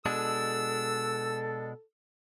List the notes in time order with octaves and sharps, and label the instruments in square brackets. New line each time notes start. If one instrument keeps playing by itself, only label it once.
[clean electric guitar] B2 G#3 D4 [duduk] A4 [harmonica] E6